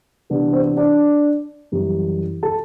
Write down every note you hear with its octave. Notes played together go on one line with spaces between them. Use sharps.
C3 E3 B3 D4
C4 C5
D4 D5
F#2 E3 G3
A4 A5